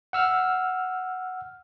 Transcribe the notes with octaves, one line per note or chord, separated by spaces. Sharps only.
F#5 E6 F6